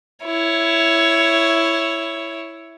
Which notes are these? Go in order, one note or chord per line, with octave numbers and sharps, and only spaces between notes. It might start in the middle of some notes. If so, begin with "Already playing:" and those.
E4 C#5